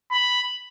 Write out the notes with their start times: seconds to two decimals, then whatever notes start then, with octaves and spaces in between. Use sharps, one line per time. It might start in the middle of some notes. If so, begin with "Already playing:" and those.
0.11 B5